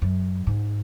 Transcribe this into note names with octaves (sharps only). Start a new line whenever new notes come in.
F#2
G#2